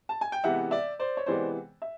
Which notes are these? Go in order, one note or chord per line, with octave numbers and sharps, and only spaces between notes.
A5
G#5
G5
C3 E3 G#3 B3 E5 F#5
D5 E5
C5 D5
C#5
C3 E3 G#3 B3 C5 D5
E5